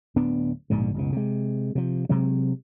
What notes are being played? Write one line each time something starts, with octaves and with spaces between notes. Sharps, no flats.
D1 B3 D4
A#1 G#2 B2 D3
F#1 C#2 B2
C3 G#3
C3 F3
C3 F#3 G#3 C4